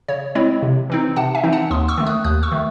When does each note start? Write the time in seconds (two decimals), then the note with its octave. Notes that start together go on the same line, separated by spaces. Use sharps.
0.08 C#3 C#5
0.35 G#3 C4 E4 C#5
0.63 C3
0.90 E3 C4 D#4
1.16 C3 F#5 A5
1.35 E5 G#5
1.44 E3 C4 D#4
1.53 F#5 A5
1.70 D#2 C6 D#6
1.88 C#6 E6
1.98 D#3 A3
2.07 D#6 F#6
2.24 D#2 D#6 F#6
2.43 C#6 E6
2.52 D#3 A3